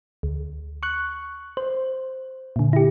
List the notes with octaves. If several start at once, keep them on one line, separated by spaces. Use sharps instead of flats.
D2
C#6 F#6
C5
A#2 D3
E4 G4